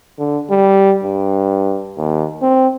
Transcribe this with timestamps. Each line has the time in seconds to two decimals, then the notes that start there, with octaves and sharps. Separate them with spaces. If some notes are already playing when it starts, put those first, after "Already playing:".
0.19 D3
0.50 G3
1.04 G2
1.98 D#2
2.42 C4